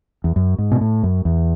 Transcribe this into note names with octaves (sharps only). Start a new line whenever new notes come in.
E2
F#2
G#2
B2
A2
F#2
E2